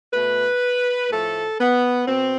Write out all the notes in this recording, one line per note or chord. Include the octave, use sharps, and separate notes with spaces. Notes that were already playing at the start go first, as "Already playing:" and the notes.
B2 A3 B4
A2 F3 A3 A4
B3
B2 C4